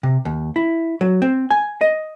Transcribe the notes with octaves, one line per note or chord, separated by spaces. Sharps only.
C3
D#2
E4
F#3
C4
G#5
D#5